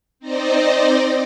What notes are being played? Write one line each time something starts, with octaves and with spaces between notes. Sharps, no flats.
C4 D#4 C5 D5 D#5